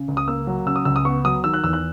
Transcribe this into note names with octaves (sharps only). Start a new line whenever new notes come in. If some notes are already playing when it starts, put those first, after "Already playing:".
Already playing: C#3
C#2
D#6
A#3 E6
F#3
C#3 E6
D#6
C#2 E6
D#6
B3 C#6
F#3 D#6
D#3 E6
F#6
E2 E6
F#6